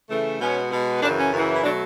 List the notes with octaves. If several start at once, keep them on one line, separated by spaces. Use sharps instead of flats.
C#3 E3 A3
B2 G#3 B3 C#4
B2 G#3 B3
F#2 C#3 E3 D4
C#4
F#2 C#3 E3
E4
B2 F#3 A3 D4